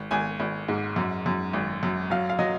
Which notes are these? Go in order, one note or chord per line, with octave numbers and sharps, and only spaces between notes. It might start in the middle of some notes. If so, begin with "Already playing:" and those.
Already playing: G#1
G#1 G#5
G#1
G#2
F#2
F#2
G#1
F#2
F#3 F5
F5
F#3 D#5